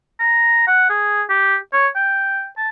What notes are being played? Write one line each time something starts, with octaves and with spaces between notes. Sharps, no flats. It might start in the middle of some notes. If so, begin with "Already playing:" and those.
A#5
F#5
G#4
G4
C#5
G5
A5